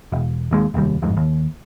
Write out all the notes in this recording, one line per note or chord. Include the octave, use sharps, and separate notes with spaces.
E1
D#1 D#2 G#3
F1 D#2 G3
G1 F2 G#2
D#2